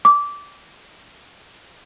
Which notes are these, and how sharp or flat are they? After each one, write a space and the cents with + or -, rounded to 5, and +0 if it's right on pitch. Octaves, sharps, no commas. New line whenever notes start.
D6 -15